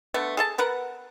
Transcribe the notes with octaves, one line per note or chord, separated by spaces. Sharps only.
D3 A3 B3
G#4 A4 A5
B3 A#4 B4 F#5